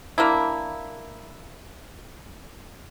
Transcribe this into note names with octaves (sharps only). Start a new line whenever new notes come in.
A#3 D4 E4